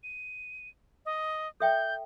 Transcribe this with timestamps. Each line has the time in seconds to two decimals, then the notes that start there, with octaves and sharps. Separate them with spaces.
0.03 D#7
1.06 D#5
1.60 A4 E5 G5 G6